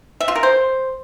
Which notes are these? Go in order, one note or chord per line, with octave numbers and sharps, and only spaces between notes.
E5
F4
A#4
C5